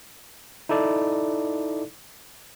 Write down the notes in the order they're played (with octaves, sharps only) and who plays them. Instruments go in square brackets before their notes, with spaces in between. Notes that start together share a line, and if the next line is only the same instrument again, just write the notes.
[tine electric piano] D#4 E4 A4 D5